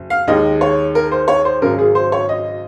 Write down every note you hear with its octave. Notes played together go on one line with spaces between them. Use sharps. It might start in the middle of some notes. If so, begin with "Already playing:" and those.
Already playing: F#1
F5
D#2 D#3 G#3 D#5
C#5
A#4
C5
C#5
C5
G#1 F#2 C#3 A#4
G#4
C5
C#5
D#5